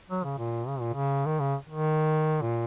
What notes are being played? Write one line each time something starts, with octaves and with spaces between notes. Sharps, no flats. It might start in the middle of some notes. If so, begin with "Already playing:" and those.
F#3
C#3
A#2
C#3
A#2
C#3
D#3
C#3
D#3
A#2